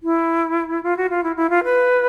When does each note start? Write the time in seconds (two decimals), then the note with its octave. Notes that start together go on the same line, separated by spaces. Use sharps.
0.03 E4
0.83 F4
0.97 F#4
1.10 F4
1.23 E4
1.36 E4
1.50 F4
1.64 B4